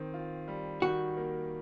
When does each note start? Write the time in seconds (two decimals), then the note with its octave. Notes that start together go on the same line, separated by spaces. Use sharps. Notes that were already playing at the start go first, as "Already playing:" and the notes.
Already playing: D#3 C4
0.14 F4
0.48 G3
0.82 D#3 F#4
1.17 A#3